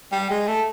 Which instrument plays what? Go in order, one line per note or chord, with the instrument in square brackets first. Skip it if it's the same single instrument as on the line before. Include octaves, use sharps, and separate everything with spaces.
[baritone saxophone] G3
G#3
A3